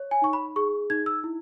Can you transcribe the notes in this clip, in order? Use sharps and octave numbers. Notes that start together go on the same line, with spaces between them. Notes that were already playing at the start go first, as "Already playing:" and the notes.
Already playing: C#5
G#5
D#4 C#6
B5
G#4 C#6
D#4 G#6
E6
E4